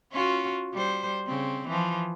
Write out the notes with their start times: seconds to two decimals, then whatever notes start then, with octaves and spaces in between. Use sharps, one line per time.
0.12 C#4 F4 F#4
0.73 G3 C5
1.27 C#3 C4
1.68 E3 F3